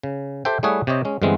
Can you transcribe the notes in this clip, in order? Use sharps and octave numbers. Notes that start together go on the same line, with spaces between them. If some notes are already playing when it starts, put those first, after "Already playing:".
C#3
G4 A4 C5 E5 G5
G3 A3 E4 G#4 C#5 F#5
C3 G4 C5 C#5 D#5
G#3 C#4
G2 D3 E3 G#3 B3 C4